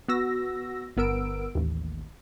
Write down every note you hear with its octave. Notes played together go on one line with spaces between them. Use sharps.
B3 F#4 E6 A#6
G1 B3 A#4 E6 D7
A1 D#2